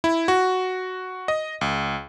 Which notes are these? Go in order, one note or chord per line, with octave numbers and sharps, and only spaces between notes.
E4
F#4
D#5
C#2